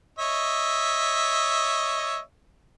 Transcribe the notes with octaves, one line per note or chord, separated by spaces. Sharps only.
C#5 D#5 E5